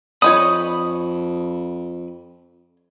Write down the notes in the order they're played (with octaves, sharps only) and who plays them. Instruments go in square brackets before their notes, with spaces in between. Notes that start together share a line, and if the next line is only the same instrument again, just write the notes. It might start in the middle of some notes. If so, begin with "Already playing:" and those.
[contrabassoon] F2 [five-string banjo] D4 D#4 C#5 [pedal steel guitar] B5 D#6